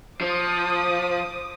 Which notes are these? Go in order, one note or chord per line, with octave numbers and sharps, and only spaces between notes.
F3 C5 D6 D#6